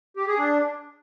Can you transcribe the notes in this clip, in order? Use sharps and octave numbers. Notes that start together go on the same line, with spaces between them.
G4
G#4
D4